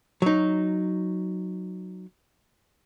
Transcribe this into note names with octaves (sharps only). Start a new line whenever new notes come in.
F#3 D#4